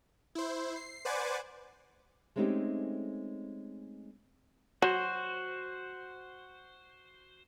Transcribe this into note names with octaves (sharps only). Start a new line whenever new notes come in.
E4 C5
C7
B4 C5 D5 F#5 G#5 D6
G#3 A3 C4 C#4 D#4 G4
F#3 F#4 C5